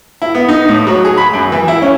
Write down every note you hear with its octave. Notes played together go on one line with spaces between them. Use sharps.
E4
B3
D#4
A2
F#3
G#4
B5
F#2
E3
E4
C#4